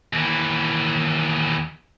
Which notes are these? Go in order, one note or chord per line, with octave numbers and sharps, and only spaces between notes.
D#2 E3